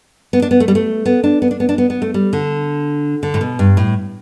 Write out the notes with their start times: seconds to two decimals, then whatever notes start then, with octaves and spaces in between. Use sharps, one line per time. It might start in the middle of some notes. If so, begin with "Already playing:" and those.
0.33 B3
0.42 D4
0.51 B3
0.60 A3
0.68 G3
0.75 A3
1.05 B3
1.24 D4
1.42 B3
1.51 D4
1.60 B3
1.69 D4
1.78 B3
1.90 B3
2.02 A3
2.14 G3
2.33 D3
3.23 D3
3.34 A2
3.41 B2
3.59 G2
3.77 A2